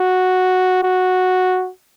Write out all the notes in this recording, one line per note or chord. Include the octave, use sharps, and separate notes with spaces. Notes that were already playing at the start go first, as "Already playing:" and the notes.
Already playing: F#4
F#4